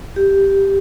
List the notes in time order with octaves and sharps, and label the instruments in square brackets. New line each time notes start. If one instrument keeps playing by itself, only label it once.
[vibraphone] G4